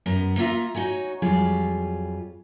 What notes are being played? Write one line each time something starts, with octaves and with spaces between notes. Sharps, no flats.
F#2 B3 A#5
A#3 F4 E5 A#5
D#4 F#4 C#5 G#5
F2 F#3 G3 F4 G#4